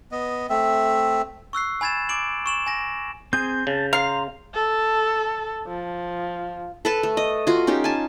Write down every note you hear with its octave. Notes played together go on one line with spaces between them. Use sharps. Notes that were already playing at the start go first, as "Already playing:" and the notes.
B3 D#5
A3 C4 E5
C#6 E6 F#6 C7
G#5 B5 G#6 A6 E7
D6 D7 F#7
C#6 E7 F#7
G#5 A#6
C4 G#4 G#5 G6
C#3 A5
F5 A#5 C6
A4
F3
A4 B4 A5
A3
D#5
F4 F#4
C#4 D#4 G4
G#5 A5